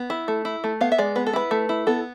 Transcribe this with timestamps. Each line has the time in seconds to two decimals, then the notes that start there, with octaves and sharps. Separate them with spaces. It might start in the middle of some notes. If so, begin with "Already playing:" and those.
Already playing: B3
0.10 E4
0.28 A3
0.45 E4
0.64 A3
0.81 B3 F5
0.92 E5
0.98 G#3 D5
1.15 B3 B4
1.27 A4
1.33 E4 B4
1.51 A3
1.69 E4
1.87 B3 A4